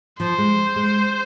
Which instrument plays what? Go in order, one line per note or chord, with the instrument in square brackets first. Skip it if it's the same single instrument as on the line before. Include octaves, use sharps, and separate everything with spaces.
[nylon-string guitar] F3 [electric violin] C5
[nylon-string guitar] G#3
G#3